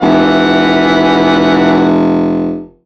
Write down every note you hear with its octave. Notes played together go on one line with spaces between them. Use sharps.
F1 E3 F#5